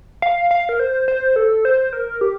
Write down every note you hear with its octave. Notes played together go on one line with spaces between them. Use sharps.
F5
F5
A#4
C5
C5
A4
C5
A#4
G4